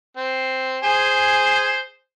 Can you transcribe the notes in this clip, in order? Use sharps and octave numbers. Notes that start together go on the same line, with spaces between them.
C4
G#4 C5 G#5